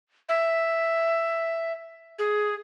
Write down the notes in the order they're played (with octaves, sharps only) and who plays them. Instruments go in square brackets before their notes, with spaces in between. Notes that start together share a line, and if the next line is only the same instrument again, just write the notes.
[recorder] E5
G#4